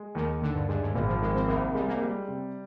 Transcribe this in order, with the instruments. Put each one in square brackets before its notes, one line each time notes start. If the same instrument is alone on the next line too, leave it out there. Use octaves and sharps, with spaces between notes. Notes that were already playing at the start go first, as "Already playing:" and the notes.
Already playing: [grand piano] G#3
[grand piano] D#2 [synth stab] D#3
[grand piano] D#2 [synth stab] D3
[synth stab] G2
[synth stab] G2 [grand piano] G#3
[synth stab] G#2
[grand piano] G#1 [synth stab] A#2
[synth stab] F3
[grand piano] D#3 [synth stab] G#3
[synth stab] C4
[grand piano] C2 [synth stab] A#3
[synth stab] G3 [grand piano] G#3
[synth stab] A#3
[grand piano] G3
C3